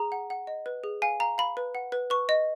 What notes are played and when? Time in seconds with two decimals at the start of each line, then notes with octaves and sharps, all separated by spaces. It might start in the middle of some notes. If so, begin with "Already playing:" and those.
Already playing: G#4 A#5
0.12 F#5
0.30 F#5
0.47 D#5
0.66 B4
0.84 G#4
1.02 F5 G#5
1.20 F5 A#5
1.38 F5 B5
1.57 B4
1.75 F#5
1.92 B4
2.10 B4 C#6
2.29 D#5